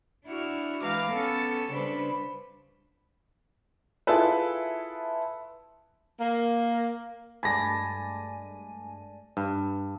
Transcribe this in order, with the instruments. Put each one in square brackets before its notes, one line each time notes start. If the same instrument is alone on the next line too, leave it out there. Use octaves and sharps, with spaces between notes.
[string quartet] D4 E4 F#4 F6
E3 G#3 B4 F5 A#5 D6
B3 C#4 A4 A5
C#3 G3 D4 B4 C5
[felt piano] E4 F4 G#4 A4 B4
[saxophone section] A#3
[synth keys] G2 G#3 A3 [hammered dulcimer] D5 A5 [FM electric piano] G#5 [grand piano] B5 A#6
[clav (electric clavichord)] G2